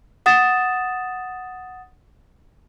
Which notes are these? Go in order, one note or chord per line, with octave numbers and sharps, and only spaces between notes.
F#5 D#6 A6 E7